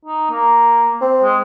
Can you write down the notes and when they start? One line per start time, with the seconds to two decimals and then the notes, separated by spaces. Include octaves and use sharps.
0.05 D#4
0.31 A#3
1.01 C4
1.24 G#3